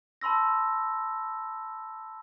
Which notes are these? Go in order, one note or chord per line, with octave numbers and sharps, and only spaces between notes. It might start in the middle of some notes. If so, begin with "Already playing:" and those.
A5 B5 C6 E6 A#6